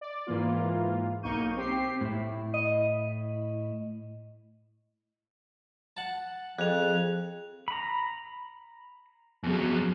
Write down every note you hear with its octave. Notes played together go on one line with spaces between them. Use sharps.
D5
G#2 E3 A#3 F4
B1 A#3 D#4 C#6 G6 D#7
C4 G4 C7
A2 E4
D#5
F#5 A5
F2 G#4 F#6 F7
A#5 B5
F2 F#3 B3 G#4